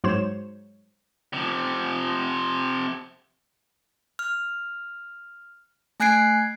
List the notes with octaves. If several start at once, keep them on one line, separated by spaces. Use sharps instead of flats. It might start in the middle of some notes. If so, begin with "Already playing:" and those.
G#2 F#3 C5 C#5 E7
C3 F3
F6
A3 G#5 F#6 G#6 C7 D7